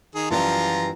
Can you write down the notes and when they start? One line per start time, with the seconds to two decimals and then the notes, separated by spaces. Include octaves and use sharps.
0.15 D#3 G#4
0.30 F#2 E3 F3 G3 F4 A#5